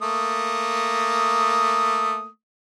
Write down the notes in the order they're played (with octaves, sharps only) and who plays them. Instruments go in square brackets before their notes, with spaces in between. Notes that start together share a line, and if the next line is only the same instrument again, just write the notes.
[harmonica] A3 A#3 D#6